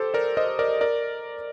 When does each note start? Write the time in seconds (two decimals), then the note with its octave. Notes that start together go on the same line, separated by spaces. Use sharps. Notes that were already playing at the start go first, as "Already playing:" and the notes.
Already playing: G4 A4 C5
0.14 A#4 D5
0.37 C5 D#5
0.59 A#4 D5
0.81 A#4 D5